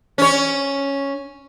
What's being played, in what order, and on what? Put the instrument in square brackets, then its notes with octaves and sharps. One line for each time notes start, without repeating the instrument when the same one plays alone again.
[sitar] C#4 C#5